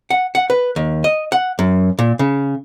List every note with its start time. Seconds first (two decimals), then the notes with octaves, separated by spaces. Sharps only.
0.10 F#5
0.35 F#5
0.50 B4
0.76 D#2
1.04 D#5
1.32 F#5
1.59 F#2
1.99 A#2
2.19 C#3